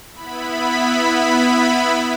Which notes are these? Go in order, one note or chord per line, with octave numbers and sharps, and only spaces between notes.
B3 E4 B5